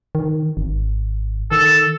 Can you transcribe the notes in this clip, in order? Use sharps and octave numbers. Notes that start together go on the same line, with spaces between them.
D#3
G#1
D#3 A4